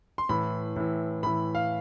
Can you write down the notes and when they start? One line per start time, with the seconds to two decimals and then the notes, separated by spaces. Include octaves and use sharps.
0.18 C6
0.29 A2 E3 B5
0.76 A2 E3
1.23 A2 E3 B5
1.55 F5